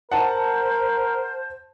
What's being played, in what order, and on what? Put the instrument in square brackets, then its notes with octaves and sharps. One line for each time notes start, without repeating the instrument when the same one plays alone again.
[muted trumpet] A#4 [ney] C5 [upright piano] F#5 A5